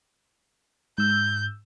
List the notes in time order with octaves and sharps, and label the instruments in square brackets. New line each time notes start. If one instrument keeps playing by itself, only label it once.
[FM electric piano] G#2 E6 [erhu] G6